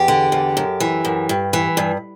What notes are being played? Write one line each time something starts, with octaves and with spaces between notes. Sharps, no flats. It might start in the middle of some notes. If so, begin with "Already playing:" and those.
Already playing: E2 G4
D3
E2
F#2
E3
F#2
G2
E3
G2